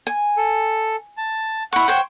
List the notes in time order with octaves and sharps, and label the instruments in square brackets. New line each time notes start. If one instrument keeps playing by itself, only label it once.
[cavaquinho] G#5
[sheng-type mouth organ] A4
A5
[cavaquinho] E4 C#6 [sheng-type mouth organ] F#5
[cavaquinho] C5 C#5 G5